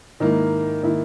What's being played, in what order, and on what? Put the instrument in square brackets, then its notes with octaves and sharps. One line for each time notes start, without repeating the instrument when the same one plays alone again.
[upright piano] G#2 D#3 A#3 E4
D#3 A#3 E4